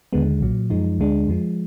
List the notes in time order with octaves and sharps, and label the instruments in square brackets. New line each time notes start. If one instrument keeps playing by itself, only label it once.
[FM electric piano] D#2 D3 G#3 B3
B1 A#2 F#3
F#2 F3 G#3 D#4
D2 D3 G#3 D4
F2 F3 G#3